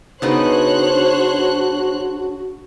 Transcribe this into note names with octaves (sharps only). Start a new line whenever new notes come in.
C#3 B3 D4 D#4 F#4 C5 C#5 F#6